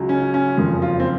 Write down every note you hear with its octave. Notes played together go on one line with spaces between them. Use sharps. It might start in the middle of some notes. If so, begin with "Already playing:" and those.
Already playing: C#2 C#3 F#3
C#4
C#4
F#1 F2 C#3 F3
F4
C4